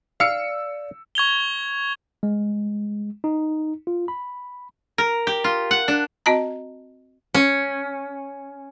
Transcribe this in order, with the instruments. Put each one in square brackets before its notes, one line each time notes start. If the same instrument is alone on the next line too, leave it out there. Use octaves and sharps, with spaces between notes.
[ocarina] D5 [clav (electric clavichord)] F5 [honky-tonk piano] E6 C#7
[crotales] C#6 G#6 F7 G7
[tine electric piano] G#3
D#4
F4
B5
[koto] A#4
G4
F4
F#5
D4
[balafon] C4 F#4 D#5 A5 A#5
[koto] C#4